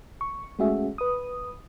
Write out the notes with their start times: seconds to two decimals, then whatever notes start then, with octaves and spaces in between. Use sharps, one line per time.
0.21 C#6
0.59 G#3 A3 C#4 F#4 G#4 E5
0.98 B4 D#6